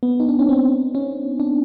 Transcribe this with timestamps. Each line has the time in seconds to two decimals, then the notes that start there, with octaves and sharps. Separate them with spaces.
0.03 B3
0.20 D#4
0.29 D4
0.39 C#4
0.49 C4
0.95 C#4
1.40 D4